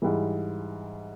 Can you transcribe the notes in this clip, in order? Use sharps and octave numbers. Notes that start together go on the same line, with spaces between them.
G#2 E3 G3